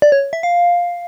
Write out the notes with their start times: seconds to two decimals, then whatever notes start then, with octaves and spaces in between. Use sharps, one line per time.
0.02 D5
0.12 C#5
0.33 E5
0.43 F5